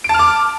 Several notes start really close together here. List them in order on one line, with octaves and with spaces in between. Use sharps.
D7 A5 F6 D6